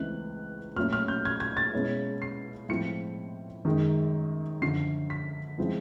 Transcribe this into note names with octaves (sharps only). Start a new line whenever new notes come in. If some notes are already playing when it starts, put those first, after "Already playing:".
Already playing: C#2 C#3 E3 A3 C4 F#6
A#2 F#3 A3 C#4 F6
F6
G6
G#6
G#6
A6
B2 G#3 C#4 E4
C7
A2 F3 G#3 C4 C#7
F#2 D#3 G#3
F#2 D3 F3 C7
B6
C#3 F3 G#3 C4 E4